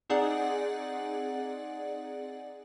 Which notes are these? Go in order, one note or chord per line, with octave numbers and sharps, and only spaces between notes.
C4 D#4 G#4 D5 F#5